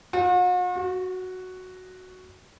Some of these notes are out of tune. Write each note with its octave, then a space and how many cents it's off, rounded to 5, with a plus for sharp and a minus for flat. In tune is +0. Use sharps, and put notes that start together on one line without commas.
F#4 -45
F#4 +0